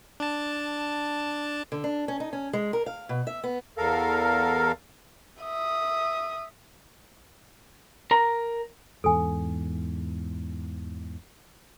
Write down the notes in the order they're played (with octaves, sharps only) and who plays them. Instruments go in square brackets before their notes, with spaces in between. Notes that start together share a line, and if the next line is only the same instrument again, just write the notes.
[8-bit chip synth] D4 A5
[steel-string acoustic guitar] D3
D4
C#4
D#4
C#4
G#3
A#4
F5
B2
E5
B3
[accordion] E2 A4 A#4 F5
[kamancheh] E5 D#6
[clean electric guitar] A#4 A#5
[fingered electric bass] E2 G#2 [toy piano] A4 G#5